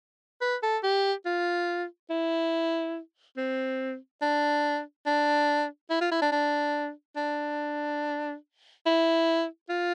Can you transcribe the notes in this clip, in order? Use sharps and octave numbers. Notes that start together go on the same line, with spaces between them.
B4
A4
G4
F4
E4
C4
D4
D4
E4
F4
E4
D4
D4
D4
E4
F4